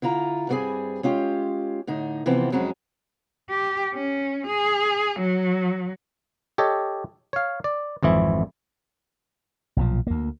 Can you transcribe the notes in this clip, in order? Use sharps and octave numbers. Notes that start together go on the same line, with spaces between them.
D3 E4 F4 A#5
G2 G3 A#3 C4 G#4 G#5
G#3 C#4 F4 G4
A2 D3 D#4
C3 E3 F3 B3 C4
F2 F#3 G#3 C4 C#4
G4
C#4
G#4
F#3
G4 A4 C#5 D#5
C#5 F5
D5
G#1 F2 E3 E4
B1 A#2 F3
D2 A#3